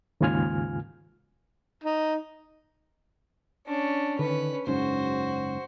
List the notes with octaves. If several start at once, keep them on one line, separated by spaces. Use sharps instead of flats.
D#2 G#2 C#3 F4 G#5 F6
D#4
C#4 D4
D3 D#3 C#4 B4
F#1 G#2 C#4 F#4 C5